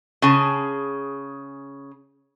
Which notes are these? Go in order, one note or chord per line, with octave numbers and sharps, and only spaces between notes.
C#3 G#4 A5